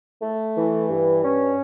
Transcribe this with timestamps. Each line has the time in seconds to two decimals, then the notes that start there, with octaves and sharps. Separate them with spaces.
0.22 A3
0.56 E3
0.89 G2
1.23 C#4